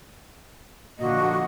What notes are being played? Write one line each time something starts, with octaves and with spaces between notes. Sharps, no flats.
A#2 D3 F3 A#3 F#4 D#5